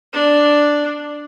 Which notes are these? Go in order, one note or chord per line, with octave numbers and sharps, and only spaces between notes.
D4